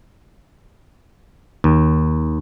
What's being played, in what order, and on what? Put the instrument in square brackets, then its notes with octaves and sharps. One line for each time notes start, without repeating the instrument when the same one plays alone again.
[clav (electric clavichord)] D#2